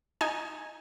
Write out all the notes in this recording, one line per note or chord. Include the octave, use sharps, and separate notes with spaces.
D#4 G#5